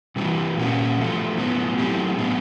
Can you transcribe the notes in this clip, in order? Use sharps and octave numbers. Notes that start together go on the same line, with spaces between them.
C3 E3 G3
A#2 G3 A#3 C#4 F#4
D3 F3 A3
A2 F#3 B3
F#3 A3 C4 E4 G4
A2 F#3 B3 D4